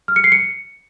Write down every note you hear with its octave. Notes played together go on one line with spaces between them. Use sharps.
F6
C#7
C7
C#7